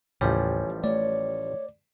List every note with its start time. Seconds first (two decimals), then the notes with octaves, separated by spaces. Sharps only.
0.21 A1 D#2 A2 C#3 F3 G3 C#5 G#5
0.84 A3 C#5 D5